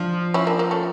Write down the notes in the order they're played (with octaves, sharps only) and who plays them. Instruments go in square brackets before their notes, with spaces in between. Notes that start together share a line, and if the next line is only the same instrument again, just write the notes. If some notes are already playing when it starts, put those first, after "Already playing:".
Already playing: [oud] F3 [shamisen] D4 F4
[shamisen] C#4 E4
A#3 D4
A#3
A3 C#4